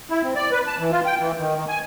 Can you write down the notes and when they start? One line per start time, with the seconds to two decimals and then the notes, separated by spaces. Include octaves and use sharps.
0.10 E4
0.23 C4
0.35 D5
0.52 B4
0.67 A5
0.79 E3
0.91 F4
1.06 G5
1.19 E3
1.38 D#3
1.56 D#3
1.68 G#5